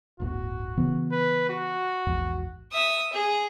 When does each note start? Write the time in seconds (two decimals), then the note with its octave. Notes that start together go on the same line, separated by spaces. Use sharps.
0.20 D1 G1 A2 F#4
0.77 C#3 E3 B3
1.11 B4
1.49 F#4
2.07 A#1 E2 G#2
2.73 E5 D#6
3.13 G#4